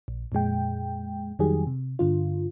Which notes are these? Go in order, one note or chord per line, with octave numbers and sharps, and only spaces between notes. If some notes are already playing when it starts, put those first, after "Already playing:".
A#1
F2 A#2 G#3 G5
F2 D#3 F#3 G3 G4 G#4
C3
G2 D3 F4